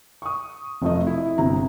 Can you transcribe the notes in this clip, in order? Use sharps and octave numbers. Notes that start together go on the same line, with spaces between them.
C#6 D#6
F1 F3 A3 D#5
E4
G1 C3 A#5